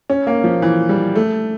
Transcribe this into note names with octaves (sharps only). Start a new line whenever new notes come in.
C#4
A#3
F3
E3
G3
A3